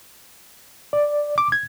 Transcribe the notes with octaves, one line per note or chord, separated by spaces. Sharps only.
D5
D6
G#6